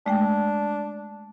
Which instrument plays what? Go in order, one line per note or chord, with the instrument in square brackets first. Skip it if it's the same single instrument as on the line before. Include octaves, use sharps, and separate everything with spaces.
[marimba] G#3 A3 G5 [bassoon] D4